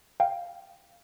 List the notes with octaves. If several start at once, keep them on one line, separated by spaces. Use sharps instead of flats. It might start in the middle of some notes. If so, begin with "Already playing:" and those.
F5 G5